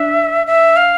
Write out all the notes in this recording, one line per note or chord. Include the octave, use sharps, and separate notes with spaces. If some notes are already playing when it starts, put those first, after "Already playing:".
Already playing: D4 E5
E5
F5